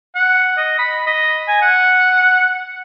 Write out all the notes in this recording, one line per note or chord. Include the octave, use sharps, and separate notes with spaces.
F#5
D#5
B5
D#5
G#5
F#5